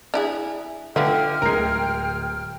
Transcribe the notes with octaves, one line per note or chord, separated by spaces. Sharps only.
D4 E4 G#4
D3 F4 B4 E5 G5 F6
D1 G#3 A#4 C7